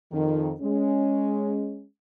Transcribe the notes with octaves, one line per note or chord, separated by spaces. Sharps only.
F2 D#3
G#3 C#4